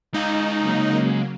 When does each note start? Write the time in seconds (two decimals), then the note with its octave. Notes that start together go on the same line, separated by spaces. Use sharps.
0.14 G#3 D#4 F5
0.60 C#3 F#3 A#3